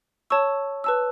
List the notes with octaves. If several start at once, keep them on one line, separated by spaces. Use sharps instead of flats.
C#5 A5 C#6 E6
B4 A5 E6